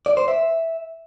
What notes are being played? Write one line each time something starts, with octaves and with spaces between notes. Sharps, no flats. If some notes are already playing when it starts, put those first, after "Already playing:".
D5
C5
E5